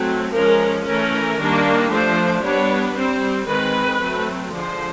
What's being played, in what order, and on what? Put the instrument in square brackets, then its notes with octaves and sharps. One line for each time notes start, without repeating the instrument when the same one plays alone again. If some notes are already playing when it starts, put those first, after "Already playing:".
Already playing: [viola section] F#3 A3 C4
F3 G#3 C#4 A#4
E3 A3 C#4 A#4
D#3 G3 A#3 D4
F3 A3 D4 C5
G3 B3 D4 C#5
G3 C4 C5
D#3 G#3 C4 B4
F#3 A3 C4
D3 F3 G#3 C5